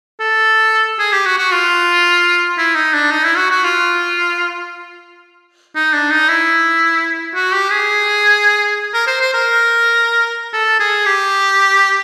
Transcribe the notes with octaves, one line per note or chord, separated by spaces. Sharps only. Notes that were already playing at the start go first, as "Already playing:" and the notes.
A4
G#4
G4
F#4
F#4
F4
E4
D#4
D4
D#4
E4
F#4
F#4
F4
D#4
D4
D#4
E4
F#4
G4
G#4
A#4
C5
C5
A#4
A4
G#4
G4